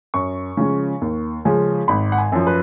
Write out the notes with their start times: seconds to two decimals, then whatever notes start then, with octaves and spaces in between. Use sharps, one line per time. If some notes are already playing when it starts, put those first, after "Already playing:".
0.14 F#2 C#6
0.57 C#3 F3 G#3 C#4
1.01 D#2
1.45 C#3 F3 G#3 C#4
1.88 G#1 B5
2.12 F#5
2.18 G#5
2.32 F#2 F3
2.47 B4